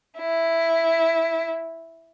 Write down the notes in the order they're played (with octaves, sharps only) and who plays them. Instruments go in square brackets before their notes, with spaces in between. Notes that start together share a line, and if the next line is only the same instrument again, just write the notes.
[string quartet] E4